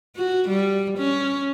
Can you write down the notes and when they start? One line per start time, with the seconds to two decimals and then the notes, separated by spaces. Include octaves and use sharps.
0.16 F#4
0.49 G3
0.98 C#4